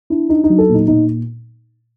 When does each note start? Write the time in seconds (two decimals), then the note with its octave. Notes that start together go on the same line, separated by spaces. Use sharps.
0.10 D4 E4
0.29 D4 D#4
0.44 D#4
0.50 F#3
0.58 A4
0.69 A#2
0.74 D#4
0.87 A#2 D#4